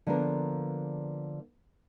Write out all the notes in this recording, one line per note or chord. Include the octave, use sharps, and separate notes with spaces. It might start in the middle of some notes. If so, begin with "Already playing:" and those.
D3 F3 A#3 B3 D4 A#4